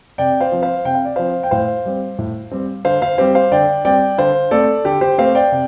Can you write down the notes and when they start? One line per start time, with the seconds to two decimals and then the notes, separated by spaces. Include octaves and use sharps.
0.18 C3 D5 G5
0.41 C5 F5
0.52 F3 C4
0.62 C5 F5
0.85 C3 G5
0.95 F5
1.05 D5
1.16 F3 C4 C5 F5
1.43 G5
1.51 A2 C5 F5
1.86 G3 C4
2.19 A2
2.51 G3 C4
2.85 D3 C5 F5
3.02 C5 F5
3.18 G3 C4 G4 C5
3.35 C5 F5
3.52 D3 D5 G5
3.85 G3 C4 D5 G5
4.18 D3 C5 F5
4.51 A3 C4 A4 D5
4.84 D3 G4
5.01 G4 C5
5.18 A3 C4 C5 F5
5.35 D5 G5
5.52 C3